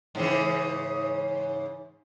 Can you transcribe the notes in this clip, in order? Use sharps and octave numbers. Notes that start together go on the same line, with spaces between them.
G#2 C#3 E3